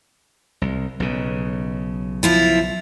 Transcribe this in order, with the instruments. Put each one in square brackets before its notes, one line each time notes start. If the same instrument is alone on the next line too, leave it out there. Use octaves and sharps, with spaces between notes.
[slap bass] C2
B1 C#3
[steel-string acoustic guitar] F3 E4 F4